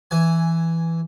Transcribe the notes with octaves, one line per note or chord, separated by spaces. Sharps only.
E3 G#5